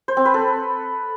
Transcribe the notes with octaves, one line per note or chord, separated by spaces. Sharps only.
C5
C4
B4
A4